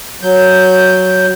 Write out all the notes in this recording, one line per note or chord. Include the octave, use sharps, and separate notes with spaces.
F#3 G6